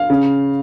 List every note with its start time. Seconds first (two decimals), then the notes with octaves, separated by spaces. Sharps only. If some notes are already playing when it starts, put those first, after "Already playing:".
Already playing: F5
0.10 C#3